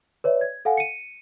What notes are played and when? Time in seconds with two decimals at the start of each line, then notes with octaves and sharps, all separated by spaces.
0.24 B4 C#5 D5 E5
0.41 G#6
0.65 A4 F5 F#5 G#5
0.77 C#7 D#7